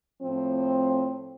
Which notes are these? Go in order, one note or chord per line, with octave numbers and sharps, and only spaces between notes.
A2 F3 C4